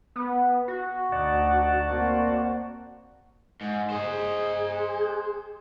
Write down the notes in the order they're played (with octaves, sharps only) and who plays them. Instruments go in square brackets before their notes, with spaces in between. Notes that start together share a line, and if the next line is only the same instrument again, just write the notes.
[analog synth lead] B3
F#4
[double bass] D2 D#4 [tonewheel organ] D5 F#5 A5
[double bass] A#3 C4
[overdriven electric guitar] G#2
[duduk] G#4 [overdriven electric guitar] C5 D#5